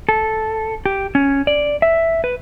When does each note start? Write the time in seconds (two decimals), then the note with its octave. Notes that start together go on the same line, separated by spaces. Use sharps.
0.09 A4
0.86 G4
1.15 C#4
1.47 D5
1.82 E5
2.24 B4